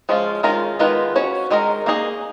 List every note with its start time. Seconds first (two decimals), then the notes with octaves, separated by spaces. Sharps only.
0.09 F3 G#3 C#4 F4
0.43 D#3 G#3 C#4 F4 A#4
0.79 D#3 G#3 B3 F4 B4
1.16 C#4 F#4 C#5
1.51 D#3 G#3 D#4 A#4
1.86 A#3 D#4 G#4 D#5